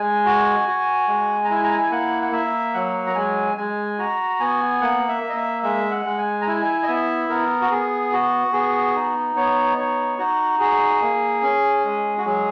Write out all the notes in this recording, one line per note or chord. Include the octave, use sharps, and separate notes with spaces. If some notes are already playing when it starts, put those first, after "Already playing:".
Already playing: G#3 G#5
F#4
F#4
G#3
A#5
E4 G#5
A#5
G#5
A#3 F#5
F#5
A#3 E5
F#3 F#5
A#5
G#3 G#5
G#3 G#5
F#4 A#5
B3 G#5
A#3 F#5
E5
A#3
D#5
E5
G#3 E5
F#5
G#3
G#5
A#5
E4 G#5
D#5
B3 E5
B3 A#4
F#4
B3 G#4
F#4
B3 G#4
D#4
B3 C#5
D#4 C#5
D#4 F#4
F#4 G#4
A#3
C#4
G#3
F#4
F#3 G#4